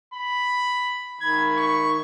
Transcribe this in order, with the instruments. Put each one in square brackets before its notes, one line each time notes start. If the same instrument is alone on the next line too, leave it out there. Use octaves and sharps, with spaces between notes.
[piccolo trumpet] B5
[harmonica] D#3 B5 [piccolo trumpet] G#6
[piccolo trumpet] C#6